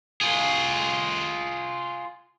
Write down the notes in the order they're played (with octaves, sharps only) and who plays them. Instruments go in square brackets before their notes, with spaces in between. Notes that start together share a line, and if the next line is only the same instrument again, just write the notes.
[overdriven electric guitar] F4 G#4